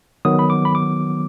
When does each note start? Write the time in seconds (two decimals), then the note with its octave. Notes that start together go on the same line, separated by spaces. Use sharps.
0.25 D#3 F#3 B3 D#6
0.39 B5
0.50 D6
0.65 B5
0.75 D6